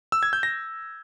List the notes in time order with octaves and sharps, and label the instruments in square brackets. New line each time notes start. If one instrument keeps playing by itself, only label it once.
[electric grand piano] E6
G#6
G6
A#6